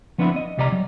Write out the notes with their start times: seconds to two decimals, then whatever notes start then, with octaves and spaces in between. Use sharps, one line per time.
0.18 F3 B3 C4 D4 E4
0.36 D#5
0.57 C2 C3 G3 D5 D#5 A#5
0.72 F#3